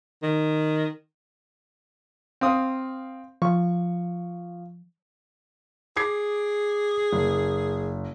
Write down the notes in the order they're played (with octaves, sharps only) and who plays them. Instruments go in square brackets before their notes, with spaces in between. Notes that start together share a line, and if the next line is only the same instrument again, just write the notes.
[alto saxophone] D#3
[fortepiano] C4 F5 D#6
[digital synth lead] F3 [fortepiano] C#6
[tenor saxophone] G#4 [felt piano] D6 G#6 C7
[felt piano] F#1